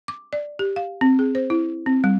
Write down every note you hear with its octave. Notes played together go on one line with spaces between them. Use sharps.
D6
D5
G4
F5
C4
G#4
C5
E4
C4
G3